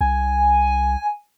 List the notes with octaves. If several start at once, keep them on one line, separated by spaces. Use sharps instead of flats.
C2 G#5